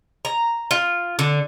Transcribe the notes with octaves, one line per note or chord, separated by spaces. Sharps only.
A#5
F4
D3